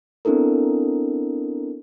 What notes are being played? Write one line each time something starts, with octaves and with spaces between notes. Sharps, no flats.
B3 C4 D4 E4 A4 A#4